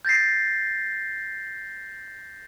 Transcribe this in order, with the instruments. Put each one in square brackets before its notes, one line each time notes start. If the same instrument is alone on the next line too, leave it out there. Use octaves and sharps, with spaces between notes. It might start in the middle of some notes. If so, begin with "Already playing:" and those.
[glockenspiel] G6 A6 A#6 C7